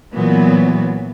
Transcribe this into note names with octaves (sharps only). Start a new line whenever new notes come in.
A#2 E3 F#3 B3